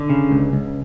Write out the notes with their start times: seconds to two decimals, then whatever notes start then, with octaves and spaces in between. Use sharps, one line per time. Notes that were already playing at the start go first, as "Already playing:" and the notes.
Already playing: D3
0.10 C#3
0.31 C#2
0.53 C#2